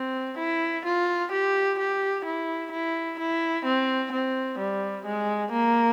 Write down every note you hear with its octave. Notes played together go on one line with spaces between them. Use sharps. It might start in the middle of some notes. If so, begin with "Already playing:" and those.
Already playing: C4
E4
F4
G4
G4
E4
E4
E4
C4
C4
G3
G#3
A#3